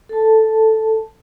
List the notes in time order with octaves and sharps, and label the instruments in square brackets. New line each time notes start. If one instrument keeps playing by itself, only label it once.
[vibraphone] A4 A5